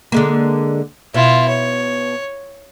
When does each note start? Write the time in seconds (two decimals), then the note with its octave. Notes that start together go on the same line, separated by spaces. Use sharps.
0.12 D3 G#3 A#3
1.14 B2 E4 F4
1.49 C#5